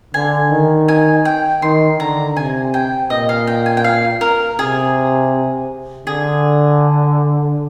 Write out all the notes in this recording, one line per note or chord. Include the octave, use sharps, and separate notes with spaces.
D3 G#5
D#3
G#5
G5
D#3 C6
D3 A#5
C3 G#5
G5
A#2 D#5
F5
G5
G#5
G5
F5
A#4
C3 G#4
D3 G#4